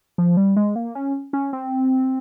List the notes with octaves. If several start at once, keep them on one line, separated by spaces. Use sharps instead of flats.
F3
G3
G#3
A#3
C#4
C#4
C4